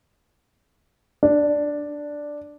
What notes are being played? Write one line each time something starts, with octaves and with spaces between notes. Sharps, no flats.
D4